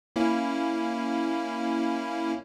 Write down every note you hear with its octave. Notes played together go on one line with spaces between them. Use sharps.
A#3 C#4 E4